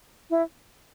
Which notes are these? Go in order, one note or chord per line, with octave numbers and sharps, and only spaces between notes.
E4